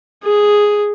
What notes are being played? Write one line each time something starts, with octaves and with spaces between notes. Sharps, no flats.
G#4